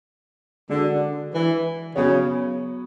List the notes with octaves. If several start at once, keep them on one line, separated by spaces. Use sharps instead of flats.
D3 G#3 D4 F#4
E3
C#3 F#3 B3 F#4 C#5